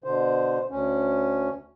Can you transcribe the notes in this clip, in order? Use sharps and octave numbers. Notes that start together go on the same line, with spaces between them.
B2 D3 C5
D2 C#4